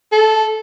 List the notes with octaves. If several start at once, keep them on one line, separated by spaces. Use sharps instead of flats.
A4